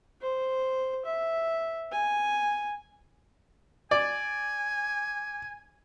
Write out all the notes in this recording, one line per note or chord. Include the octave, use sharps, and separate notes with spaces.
C5
E5
G#5
D5 G#5